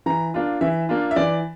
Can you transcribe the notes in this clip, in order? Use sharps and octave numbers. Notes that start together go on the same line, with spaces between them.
E3 A#5
A#3 D4 F4
E3 E5
A#3 D4 F4
E5
E3 D5